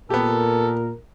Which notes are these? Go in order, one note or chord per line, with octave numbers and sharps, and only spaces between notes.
A#2 B3 G4 A4 A#4